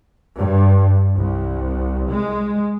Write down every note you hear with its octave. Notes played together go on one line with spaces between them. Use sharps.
G2
C2
G#3